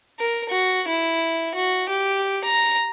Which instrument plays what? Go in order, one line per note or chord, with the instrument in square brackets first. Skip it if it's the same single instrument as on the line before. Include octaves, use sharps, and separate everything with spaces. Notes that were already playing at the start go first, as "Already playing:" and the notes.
[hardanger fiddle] A#4
F#4
E4
F#4
G4
A#5